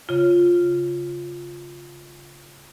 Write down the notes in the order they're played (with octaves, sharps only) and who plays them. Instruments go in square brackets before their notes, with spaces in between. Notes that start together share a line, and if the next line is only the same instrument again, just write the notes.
[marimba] C#3 F4